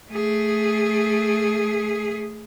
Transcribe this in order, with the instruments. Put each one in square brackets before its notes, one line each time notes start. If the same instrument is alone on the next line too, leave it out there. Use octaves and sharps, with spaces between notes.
[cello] A3 G#4